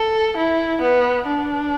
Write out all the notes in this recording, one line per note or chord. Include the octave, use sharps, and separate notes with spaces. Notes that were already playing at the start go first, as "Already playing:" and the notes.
Already playing: A4
E4
B3
D4